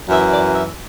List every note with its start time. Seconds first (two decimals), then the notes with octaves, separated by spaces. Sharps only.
0.09 F#2 E3 E5
0.32 D5
0.55 E5